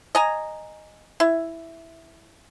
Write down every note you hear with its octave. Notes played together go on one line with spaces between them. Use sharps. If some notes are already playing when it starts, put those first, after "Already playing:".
D#5 G#5 A#5
E4